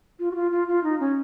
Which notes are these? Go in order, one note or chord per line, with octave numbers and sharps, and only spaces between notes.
F4
F#4
F4
F4
F4
D#4
C#4